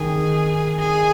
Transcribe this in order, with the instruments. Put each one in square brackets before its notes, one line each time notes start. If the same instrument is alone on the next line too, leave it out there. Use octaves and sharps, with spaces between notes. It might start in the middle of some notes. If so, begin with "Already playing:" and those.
Already playing: [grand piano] D#3 [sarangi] G#4
[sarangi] G#4